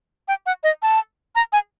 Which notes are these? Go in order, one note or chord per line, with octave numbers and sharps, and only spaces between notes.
G5
F#5
D#5
A5
A#5
G#5